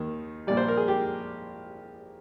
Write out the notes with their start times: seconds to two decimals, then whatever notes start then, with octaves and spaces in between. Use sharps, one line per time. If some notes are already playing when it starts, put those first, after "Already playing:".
Already playing: D#2 D#3
0.47 A#1 A#2 G3 D5
0.57 C5
0.68 A#4
0.77 G#4
0.88 G4